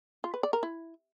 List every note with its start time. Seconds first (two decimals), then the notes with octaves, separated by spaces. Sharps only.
0.24 F4
0.34 B4
0.43 D5
0.53 A#4
0.63 E4